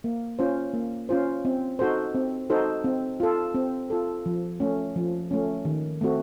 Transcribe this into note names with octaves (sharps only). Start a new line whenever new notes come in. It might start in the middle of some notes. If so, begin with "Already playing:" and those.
A#3
C#4 F4 C5
A#3
C#4 F4 C5
C4
D#4 F#4 A4 C5
C4
D#4 F#4 A4 C5
C4
F4 A4
C4
F4 A4
F3
A3 C#4
F3
A3 C#4
D#3
A3 C4 F#4